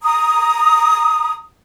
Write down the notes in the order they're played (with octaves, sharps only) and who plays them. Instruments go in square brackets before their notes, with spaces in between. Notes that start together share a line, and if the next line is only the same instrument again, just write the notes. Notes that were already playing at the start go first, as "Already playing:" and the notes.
[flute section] A#5 D#6